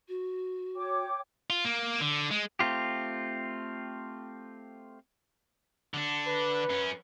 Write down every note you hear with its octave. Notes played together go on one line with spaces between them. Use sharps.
F#4
C#5 G5 D6
F4
A#3
D3
G#3
A3 C4 F4 G4
D3 D4
B4
F#2 C#4